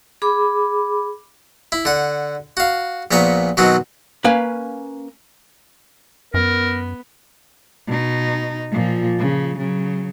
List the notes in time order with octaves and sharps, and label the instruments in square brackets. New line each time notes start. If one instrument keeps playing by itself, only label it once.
[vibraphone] G#4 B5 D6
[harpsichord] E4
D3 F#5
F#4 F5
A#1 A#2 B3 A#5 C#6
B2 D#3 F#3 C4 F#4
[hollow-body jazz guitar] A#3 C#4 B4 F5 G#5
[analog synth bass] F#2 [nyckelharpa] B3 [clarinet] A#4
[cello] B2 D#4
A#2 F3
C#3 F3
C#3 F#3